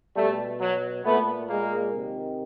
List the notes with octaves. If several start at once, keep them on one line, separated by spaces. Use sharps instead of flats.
B2 G3 A3
F#3
A#2 A3 B3
G#3 A#3
C3 D#3